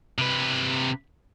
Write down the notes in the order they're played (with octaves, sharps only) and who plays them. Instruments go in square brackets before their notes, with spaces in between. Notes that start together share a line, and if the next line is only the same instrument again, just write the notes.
[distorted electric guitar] C3 B4